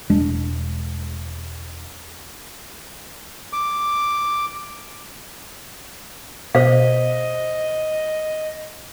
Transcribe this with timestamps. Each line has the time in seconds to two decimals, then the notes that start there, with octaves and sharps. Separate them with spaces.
0.09 E1 G#3 D4
3.53 D6
6.55 B2 C5 D#5 F5